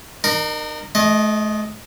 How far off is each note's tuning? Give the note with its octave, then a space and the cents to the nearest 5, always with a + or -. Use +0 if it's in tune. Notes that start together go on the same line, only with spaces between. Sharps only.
D#4 -40 A#4 +0
A3 -40 D#5 +0